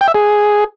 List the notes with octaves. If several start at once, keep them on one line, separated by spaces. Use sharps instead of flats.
G5
E5
G#4